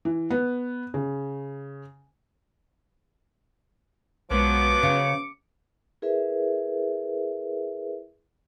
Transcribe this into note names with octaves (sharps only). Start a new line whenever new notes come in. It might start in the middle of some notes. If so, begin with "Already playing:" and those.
E3
B3
C#3
B1 F3 F#3 G#3 B3 D6
C#3 C#7
E4 G#4 A#4 B4 E5